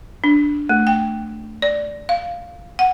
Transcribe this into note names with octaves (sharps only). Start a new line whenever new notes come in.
D4
A3
G5
D5
F5
F#5